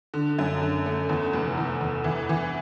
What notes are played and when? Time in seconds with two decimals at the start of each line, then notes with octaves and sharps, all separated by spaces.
0.14 D3
0.38 F#2
0.62 D3
0.86 A3
1.09 E2
1.33 F1
1.57 E2
1.81 E2
2.04 E3
2.29 E3